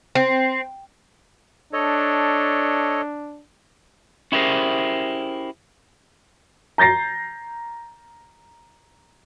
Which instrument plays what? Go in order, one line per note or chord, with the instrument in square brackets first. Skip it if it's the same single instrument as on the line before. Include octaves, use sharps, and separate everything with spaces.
[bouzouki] C4
[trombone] D4 [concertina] A4 C#5 D#5
[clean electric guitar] C#4 E4 G4 G#4 A#4 C5
[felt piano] A#5 G6 A6 A#6 C7